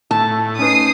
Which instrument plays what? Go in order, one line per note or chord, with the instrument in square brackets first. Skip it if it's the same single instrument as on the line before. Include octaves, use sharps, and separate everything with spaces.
[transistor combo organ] A2 [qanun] A5
[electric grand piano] C#4 D#4 B4 [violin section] D#6 C7